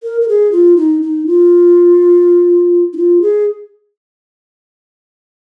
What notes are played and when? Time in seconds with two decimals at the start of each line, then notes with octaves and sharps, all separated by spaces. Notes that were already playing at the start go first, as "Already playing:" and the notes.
0.03 A#4
0.21 A#4
0.28 G#4
0.52 F4
0.77 D#4
1.02 D#4
1.27 F4
2.93 D#4
2.97 F4
3.22 G#4